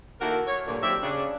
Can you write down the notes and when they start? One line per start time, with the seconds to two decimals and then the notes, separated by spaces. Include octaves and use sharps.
0.21 D#3 A#3 E4 F#4 A4 A#4
0.47 C#5
0.67 D2 G2 A#2
0.81 D#2 F#3 C4 G4 D5 E5
1.03 C#3 D4